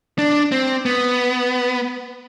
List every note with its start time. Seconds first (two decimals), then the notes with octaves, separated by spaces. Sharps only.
0.18 D4
0.52 C4
0.86 B3